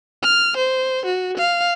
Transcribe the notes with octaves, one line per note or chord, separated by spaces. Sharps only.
F6
C5
F#4
F5